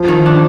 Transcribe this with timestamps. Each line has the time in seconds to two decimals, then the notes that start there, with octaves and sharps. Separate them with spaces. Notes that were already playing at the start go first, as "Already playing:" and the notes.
Already playing: F3
0.08 D#3
0.26 D4